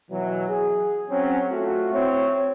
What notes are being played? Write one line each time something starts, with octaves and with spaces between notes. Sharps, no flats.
B2 E3 F#3
G#4
F#3 C4 C#4
A3 F4 F#4
C4 E4 C#5